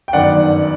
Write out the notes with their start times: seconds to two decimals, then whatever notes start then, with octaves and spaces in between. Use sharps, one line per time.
0.08 G5
0.13 G1 F#2 D#3 D5 F#5